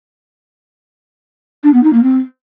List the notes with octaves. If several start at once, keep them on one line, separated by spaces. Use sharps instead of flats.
D4
B3
D#4
A#3
C4